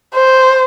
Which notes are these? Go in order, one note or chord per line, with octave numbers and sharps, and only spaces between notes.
C5